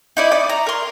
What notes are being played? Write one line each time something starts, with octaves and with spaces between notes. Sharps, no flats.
D#4 E4 D5
D5 D6 D#6
A#5
A#4 C6